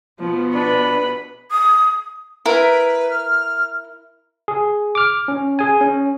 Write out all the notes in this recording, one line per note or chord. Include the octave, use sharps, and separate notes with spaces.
B2 F3 B3
D4 B4 B5
D#6
E4 A#4 B4
F6
G#4
D6 F6
C#4
G#4 G#5
C#4